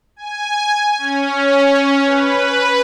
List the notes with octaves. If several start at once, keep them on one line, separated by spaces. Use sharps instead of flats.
G#5
C#4
B4